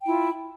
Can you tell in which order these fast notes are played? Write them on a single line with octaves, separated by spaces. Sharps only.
G5 E4 F4